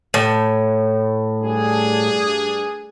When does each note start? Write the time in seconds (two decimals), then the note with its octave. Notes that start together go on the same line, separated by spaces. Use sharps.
0.14 A2
1.41 G2 D4 G#4